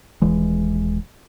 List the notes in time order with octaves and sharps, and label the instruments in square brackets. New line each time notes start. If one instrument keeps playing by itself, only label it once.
[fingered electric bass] D#1 E3 G#3